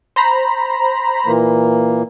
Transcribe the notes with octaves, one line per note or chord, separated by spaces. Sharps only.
C5 A#5 B5
A#2 E3 A#3